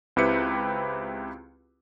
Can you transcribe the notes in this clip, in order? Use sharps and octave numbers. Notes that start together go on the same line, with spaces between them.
C#2 C4 E4 G4 B4 C#7